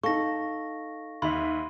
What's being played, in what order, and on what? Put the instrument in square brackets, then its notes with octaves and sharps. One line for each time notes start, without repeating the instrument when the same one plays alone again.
[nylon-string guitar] D#4 A4 [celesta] F5 [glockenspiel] C#6 A#6
[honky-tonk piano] D#2 E5 [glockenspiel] B5 C6